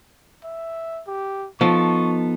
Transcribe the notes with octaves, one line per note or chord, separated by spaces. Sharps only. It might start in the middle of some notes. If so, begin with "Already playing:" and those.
E5
G4
F3 B3 D#4 A4 C#6